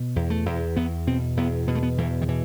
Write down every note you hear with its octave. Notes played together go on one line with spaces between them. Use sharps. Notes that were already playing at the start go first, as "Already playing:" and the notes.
Already playing: B2
E2
A3
E2
E2 B3
B2 C4
E2 B3
B2 B3
A3
B3
E2 E3
D#3
B2 E3